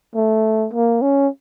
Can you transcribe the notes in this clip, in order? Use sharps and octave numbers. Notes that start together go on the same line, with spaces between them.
A3
A#3
C#4